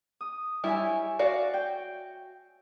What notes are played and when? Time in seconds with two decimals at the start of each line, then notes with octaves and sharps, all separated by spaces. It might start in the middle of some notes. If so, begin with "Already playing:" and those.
0.21 D#6
0.64 G3 E4 C#5 E5 G#5
1.19 F#4 D5 F5
1.54 G5